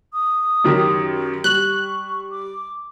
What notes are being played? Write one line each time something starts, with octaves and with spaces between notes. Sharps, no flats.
D#6
F#2 D#3 G4
G3 C#6 F#6
D6